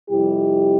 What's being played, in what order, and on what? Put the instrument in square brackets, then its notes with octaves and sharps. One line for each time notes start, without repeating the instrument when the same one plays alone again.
[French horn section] F2 C3 G3 E4 G4